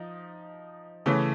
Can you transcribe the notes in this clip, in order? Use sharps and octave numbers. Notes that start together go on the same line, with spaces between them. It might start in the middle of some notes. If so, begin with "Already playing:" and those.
Already playing: F3 D#4
C#3 E3 A3 C#4